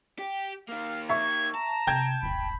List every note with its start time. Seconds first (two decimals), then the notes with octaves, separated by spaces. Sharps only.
0.19 G4
0.69 D#3 A#3 F5
1.09 E5 C#6 G#6
1.55 A5 A#5
1.87 C3 G5 G6 G#6
2.23 D#1 G#1 B5